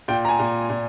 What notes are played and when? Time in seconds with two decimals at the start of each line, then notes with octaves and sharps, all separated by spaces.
0.08 A#2 G5
0.25 A#5
0.29 G#5
0.39 A#2
0.69 A#2